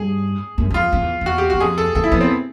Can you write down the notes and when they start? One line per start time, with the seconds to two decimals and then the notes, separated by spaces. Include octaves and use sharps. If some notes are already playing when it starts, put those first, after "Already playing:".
Already playing: G2 G#4
0.58 F#2
0.70 F#2
0.74 F2 F4
0.92 F2
1.02 E2
1.21 E2 F#4
1.38 G4
1.50 F#4
1.54 E2
1.60 F2 G#4
1.78 A4
1.95 E2 A4
2.04 E4
2.12 F2 B3
2.21 C4